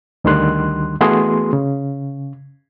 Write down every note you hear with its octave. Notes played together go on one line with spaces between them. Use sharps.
D2 D3 D#3 G3 C6 F#6
E3 A3 B3 F#4 G#4 C6
C#3